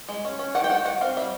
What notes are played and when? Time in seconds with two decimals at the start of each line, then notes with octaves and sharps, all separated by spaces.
0.09 G#3
0.25 C#4
0.39 C#4
0.55 D#3 F#5
0.64 G5
0.70 D#3 F#5
0.85 D#3 F#5
1.01 C4 F5
1.17 G3 E5